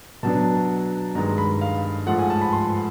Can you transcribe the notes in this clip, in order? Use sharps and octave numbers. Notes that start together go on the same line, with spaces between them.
B2 F#3 B3 D4 A5
G2 D#3 G#3 A#5
B5
F5
G#2 F3 A3 F#5
G#5
A5
B5
C6